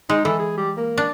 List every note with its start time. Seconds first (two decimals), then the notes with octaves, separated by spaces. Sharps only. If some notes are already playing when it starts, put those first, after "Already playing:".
0.09 G#3 D#4
0.25 E3 A4
0.39 G#4
0.57 G3
0.77 A#3
0.98 D4